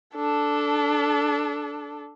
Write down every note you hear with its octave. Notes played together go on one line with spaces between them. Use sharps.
D4 A4